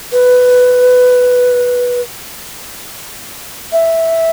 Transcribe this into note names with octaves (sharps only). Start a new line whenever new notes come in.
B4
E5